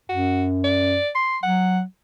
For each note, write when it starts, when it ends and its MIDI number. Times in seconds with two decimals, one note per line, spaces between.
0.10 0.99 42
0.10 0.45 66
0.64 1.10 74
1.15 1.38 84
1.43 1.82 54
1.43 1.80 78